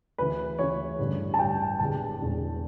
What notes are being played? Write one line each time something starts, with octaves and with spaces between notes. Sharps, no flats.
D2 C#3 E3 B4
D2 C#3 E3 C#5
A1 G2 D3
A5
A1 G2 D3 G5
E1 E2 D3 A5
E1 E2 D3